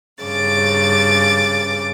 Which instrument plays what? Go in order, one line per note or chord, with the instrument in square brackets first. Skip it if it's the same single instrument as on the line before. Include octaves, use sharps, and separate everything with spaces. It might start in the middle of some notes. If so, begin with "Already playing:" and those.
[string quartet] G2 C#3 D6 A6